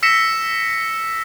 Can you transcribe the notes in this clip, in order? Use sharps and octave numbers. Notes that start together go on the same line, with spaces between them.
E6 A#6 B6 C#7 E7